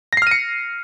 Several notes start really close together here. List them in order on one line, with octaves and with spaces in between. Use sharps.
A#6 C7 F6 D#7 C#7